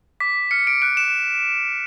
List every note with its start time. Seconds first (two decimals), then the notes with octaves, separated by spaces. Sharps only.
0.20 D6 B6
0.51 F6 C#7
0.67 D7
0.82 F#6 D7
0.97 E7